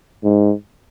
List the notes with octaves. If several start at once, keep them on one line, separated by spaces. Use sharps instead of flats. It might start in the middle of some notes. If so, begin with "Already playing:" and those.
G#2